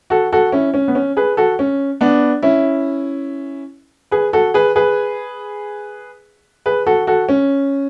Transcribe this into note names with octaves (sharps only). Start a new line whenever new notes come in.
F#4 A4
F#4 A4
C#4 E4
C#4
B3
C#4
G#4 B4
F#4 A4
C#4
B3 D4
C#4 E4
G#4 B4
F#4 A4
G#4 B4
G#4 B4
G#4 B4
F#4 A4
F#4 A4
C#4